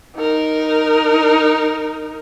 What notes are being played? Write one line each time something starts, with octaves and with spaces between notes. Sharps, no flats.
D#4 A#4